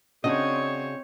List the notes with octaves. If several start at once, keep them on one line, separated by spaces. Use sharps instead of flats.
C#3 C4 D4 F#4 C#5 D#5